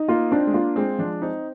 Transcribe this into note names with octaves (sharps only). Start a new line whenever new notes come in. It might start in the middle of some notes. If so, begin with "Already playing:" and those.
Already playing: D#4
A#3 F4
C4 D4
G#3
A#3 F4
G#3 C4
F3 D4
C4 D#4